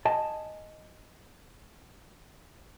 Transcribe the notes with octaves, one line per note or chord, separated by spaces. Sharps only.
D#5 G#5 A5